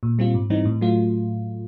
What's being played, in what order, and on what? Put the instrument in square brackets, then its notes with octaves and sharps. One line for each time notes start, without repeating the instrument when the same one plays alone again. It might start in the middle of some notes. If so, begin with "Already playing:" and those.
[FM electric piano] A#2
G3 C4 F4
G#2
E3 G3 C4 D#4
A2
F#3 A3 F4